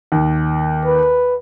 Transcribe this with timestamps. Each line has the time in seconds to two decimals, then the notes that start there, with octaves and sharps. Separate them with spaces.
0.12 D#2
0.86 B4